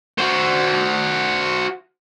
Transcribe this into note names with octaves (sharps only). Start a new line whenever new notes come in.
F#4 C5